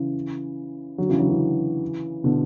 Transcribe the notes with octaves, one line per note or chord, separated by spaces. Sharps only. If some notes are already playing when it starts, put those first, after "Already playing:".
Already playing: C#3 E3
D3 F#3
C#3 E3
D3 F#3
C#3 E3
B2 D3